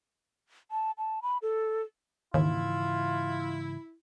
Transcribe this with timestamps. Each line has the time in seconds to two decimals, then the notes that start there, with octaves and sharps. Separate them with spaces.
0.71 A5
0.98 A5
1.23 B5
1.42 A4
2.34 D#2 G#2 C#3 E3 E4 F4